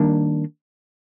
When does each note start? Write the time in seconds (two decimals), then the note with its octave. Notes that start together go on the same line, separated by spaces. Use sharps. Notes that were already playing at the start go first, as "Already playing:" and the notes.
Already playing: D#3 G3 A#3 D4